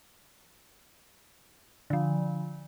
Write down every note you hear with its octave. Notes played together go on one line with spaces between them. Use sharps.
D3 F3